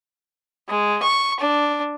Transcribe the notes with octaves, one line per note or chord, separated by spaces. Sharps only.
G#3
C#6
D4